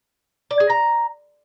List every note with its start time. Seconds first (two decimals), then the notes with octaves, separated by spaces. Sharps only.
0.51 D5
0.60 G#4
0.70 A#5